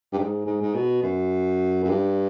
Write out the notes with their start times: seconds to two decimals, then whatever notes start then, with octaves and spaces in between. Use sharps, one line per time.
0.13 G2
0.19 G#2
0.46 G#2
0.61 G#2
0.75 B2
1.03 F#2
1.84 F#2
1.89 G2